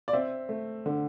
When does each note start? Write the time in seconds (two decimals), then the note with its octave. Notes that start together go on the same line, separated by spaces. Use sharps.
0.08 D5
0.13 C4 E5
0.49 A3
0.86 D3